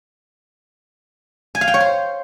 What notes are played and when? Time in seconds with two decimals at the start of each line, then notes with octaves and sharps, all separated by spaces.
1.55 G#5
1.61 F5
1.68 G5
1.74 C#5
1.80 C5